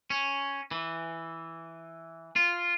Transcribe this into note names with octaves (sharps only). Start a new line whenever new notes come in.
C#4
E3
F4